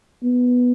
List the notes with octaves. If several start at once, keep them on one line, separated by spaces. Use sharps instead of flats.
B3